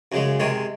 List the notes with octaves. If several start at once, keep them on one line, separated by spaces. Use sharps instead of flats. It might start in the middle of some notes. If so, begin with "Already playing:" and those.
F#2 C#3 G#3
C3 D#3 G#3 C#4